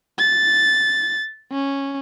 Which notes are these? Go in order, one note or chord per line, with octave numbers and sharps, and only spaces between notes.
A6
C#4